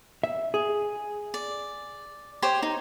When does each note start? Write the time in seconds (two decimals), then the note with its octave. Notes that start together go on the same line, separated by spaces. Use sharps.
0.23 E5
0.54 G#4
1.34 D5
2.42 G4 C5 C#5
2.63 D#4